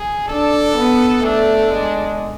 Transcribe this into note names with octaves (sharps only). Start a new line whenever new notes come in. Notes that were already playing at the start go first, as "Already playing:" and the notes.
Already playing: G#4
D4 A4
B3
A3 D4
G#3